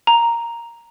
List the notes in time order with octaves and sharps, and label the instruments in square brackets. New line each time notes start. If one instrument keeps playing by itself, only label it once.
[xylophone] A#5